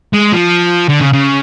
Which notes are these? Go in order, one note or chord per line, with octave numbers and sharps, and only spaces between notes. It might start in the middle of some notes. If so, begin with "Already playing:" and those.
G#3
F3
D3
C#3
C#3